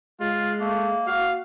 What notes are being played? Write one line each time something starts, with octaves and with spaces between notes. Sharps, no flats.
G#3 F4
A3 A#3
F#4 F5